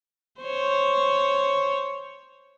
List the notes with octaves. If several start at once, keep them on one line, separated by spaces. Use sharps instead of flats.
C5 C#5